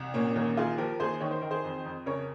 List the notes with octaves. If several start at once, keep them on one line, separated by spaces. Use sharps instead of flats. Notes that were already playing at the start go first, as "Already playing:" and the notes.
Already playing: C2
A#2 A#3 C#4
D#2 A#3 C#4
D#2 F4 G#4
F3 G4 A#4
D#2 G#4 C5
D#3 C#5
C5
D#3 A#4
G#4 C5
F2
F2
C#3 A#4 C#5